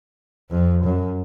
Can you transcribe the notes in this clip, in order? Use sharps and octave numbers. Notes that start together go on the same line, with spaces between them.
F2
F#2